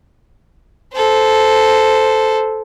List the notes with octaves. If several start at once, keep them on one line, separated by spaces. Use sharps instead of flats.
A4 C5